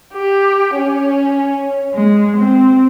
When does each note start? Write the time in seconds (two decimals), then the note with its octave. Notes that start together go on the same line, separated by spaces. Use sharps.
0.13 G4
0.76 C#4
1.94 G#3
2.37 C4